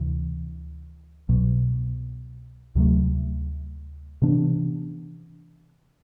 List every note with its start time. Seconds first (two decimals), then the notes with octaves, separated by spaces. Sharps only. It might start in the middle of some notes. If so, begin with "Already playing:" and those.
Already playing: D2 C3 E3
1.29 C2 B2 F#3
2.75 D2 C3 F#3 A3
4.22 C3 E3 B3 D4